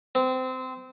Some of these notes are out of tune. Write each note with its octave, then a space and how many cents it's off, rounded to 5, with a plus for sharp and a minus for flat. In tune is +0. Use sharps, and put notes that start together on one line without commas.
C4 -20